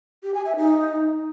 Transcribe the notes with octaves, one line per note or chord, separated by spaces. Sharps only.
G4
G#5
E5
D#4